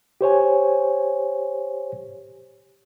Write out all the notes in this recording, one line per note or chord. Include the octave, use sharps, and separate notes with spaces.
G4 C5 C#5 G#5